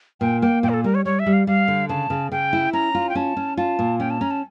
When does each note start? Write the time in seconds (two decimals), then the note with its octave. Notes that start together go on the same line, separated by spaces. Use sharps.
0.21 A#2 G5
0.42 A#3 G5
0.63 A#2 G5
0.69 A#4
0.74 A4
0.84 G3 A#4
0.95 C#5
1.05 G3 C#5
1.19 E5
1.26 G3
1.33 F5
1.47 G3 F5
1.68 D3
1.89 C#3 A5
2.10 C#3
2.32 C#3 G5
2.53 E4
2.73 C#4 A#5
2.95 F4
3.09 G5
3.15 C#4 A5
3.37 C#4
3.57 F4 A5
3.79 A#2
3.99 C#4 G5
4.10 A5
4.21 C#4 A#5
4.31 A5